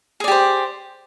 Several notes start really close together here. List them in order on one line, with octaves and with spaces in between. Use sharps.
G#4 D5 G4 C5